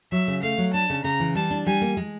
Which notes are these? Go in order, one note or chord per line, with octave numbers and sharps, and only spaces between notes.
F#3 E5
C#3
A3 F5
F#3
D4 A5
C#3
C#3 A#5
E3
G3 A5
D4
G3 G#5
A#3
G#3